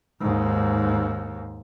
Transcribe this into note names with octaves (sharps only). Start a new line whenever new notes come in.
D#2 G#2